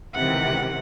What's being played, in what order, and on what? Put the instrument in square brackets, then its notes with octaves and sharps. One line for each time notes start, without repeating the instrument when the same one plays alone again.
[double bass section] C#2 D#3 [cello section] C3 E3 [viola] F#5